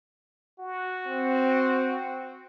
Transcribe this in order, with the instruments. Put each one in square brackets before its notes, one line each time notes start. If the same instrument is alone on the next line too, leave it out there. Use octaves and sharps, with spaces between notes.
[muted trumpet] F#4
[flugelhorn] C4